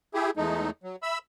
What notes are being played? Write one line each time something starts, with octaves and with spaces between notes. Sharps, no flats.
E4 G4 G#4
E2 G#3 A3 D#4
F#3
E5 B5 E6